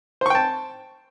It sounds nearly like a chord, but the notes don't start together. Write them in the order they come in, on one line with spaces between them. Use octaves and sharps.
C5 C#6 G5 A5